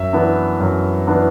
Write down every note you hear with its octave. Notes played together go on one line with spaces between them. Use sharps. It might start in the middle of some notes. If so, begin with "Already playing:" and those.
Already playing: F#2 E5
E3 B3 D4
F#2
E3 B3 D4